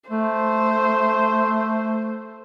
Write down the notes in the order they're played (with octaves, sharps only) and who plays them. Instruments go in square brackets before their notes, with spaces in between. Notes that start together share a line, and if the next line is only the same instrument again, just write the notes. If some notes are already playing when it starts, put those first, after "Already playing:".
[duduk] A3 [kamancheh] C5